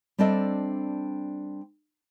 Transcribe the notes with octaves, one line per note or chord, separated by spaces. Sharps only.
G3 C4 D4 A4 D#5 E5